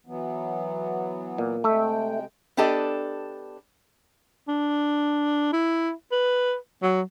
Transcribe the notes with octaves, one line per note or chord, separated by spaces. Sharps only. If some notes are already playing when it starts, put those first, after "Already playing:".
E3 F#3 B3
A#2
C3 G#3 A3 E5 G5
B3 D4 G4 A4 D5 D#5
D4
E4
B4
F#3